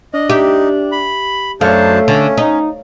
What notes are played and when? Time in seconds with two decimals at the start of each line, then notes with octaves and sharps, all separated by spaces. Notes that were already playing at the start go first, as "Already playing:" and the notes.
0.14 D4 D#5
0.30 D#4 G4 E5
0.92 B5
1.61 F#2 A3 D4 C5 C#5 F5 A5
2.08 D3 C#4
2.37 D#4